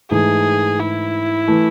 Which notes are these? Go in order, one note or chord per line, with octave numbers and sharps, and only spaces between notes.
G#2 E3 A3 D#4 G#4
E4
E3 A3